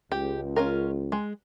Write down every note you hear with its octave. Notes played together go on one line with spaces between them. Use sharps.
C#2 G4
C#4 F4 A#4
G#3